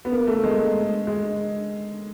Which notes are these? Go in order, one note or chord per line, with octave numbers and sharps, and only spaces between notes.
B3
A#3
A3
G#3
G#3